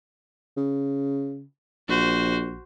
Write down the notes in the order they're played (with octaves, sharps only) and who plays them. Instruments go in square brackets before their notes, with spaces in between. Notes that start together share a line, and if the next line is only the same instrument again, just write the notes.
[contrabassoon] C#3
[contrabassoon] A#1 [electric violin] F#4 C5